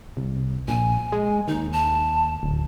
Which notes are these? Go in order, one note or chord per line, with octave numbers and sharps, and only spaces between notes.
C2
A#1 G#5
G#3
D#2 D#4
A5
D1